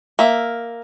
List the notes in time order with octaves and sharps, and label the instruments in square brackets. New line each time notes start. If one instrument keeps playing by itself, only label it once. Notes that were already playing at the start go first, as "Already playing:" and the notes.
[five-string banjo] A#3 E5